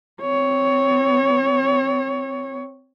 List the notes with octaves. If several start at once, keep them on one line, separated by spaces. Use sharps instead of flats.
C4 C#5